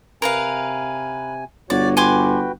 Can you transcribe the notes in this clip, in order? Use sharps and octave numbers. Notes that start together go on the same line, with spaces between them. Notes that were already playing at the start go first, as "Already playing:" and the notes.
C3 A#4 B4 F5 G#5
G1 F#4 C#5 D5
F#4 B4 G5 G#5 C6 D6